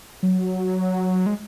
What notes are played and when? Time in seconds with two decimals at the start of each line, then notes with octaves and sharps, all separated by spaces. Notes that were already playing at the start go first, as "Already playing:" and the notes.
0.23 F#3
1.26 G#3